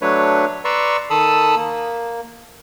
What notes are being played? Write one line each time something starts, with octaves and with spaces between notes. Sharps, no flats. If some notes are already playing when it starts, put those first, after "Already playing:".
F#3 A3 D4 B4 C#5
B4 D5 A#5 C6 C#6 E6
D#3 A4 A5 B5 D#6 E6
A#3